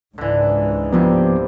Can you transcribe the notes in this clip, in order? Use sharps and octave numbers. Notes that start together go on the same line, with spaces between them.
C#2 G#2 D3 E3
G2 C3 F3 A#3 B3